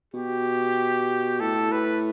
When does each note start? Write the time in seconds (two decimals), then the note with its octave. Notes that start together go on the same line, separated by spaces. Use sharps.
0.14 B2 G4
1.40 A2 A4
1.72 B4